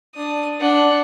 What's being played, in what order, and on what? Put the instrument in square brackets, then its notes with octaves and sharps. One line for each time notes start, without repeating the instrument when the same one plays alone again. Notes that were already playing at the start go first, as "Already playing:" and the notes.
[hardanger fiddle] D4 D#6
D4 F#5